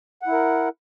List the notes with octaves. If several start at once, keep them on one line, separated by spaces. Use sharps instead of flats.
E4 A#4 F#5